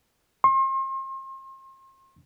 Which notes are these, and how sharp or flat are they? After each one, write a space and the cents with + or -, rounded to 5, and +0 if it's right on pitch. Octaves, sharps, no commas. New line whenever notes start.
C6 +40